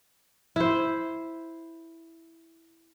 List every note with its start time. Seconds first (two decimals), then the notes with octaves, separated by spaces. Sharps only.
0.56 E4 C5